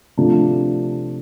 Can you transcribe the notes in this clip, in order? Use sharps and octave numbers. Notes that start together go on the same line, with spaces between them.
C3 F3 A3 D4 F4